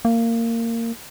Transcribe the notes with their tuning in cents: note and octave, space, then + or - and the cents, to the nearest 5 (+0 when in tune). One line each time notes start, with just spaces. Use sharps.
A#3 -20